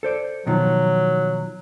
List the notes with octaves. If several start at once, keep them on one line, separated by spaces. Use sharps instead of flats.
A4 C5 D5
B2 D#3 F3 F#3